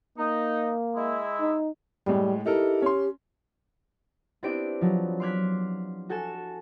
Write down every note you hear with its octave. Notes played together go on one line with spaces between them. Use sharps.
A#3 D#4
G#3 E4
D#4
A2 G3 G#3
D#4 E4 G4 A4 A#4
C#4 C6
B3 C4 D4 E4 G4 D7
F3 F#3
C6 D6 F6 F#6 G#6 B6
F#4 A4 G#5 G#6 E7